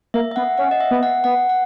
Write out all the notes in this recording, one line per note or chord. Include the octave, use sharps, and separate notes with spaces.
A#3 E5
E5
B3 F#5
C#4 F#5
D#5
E5
B3
F#5
B3 F#5
F#5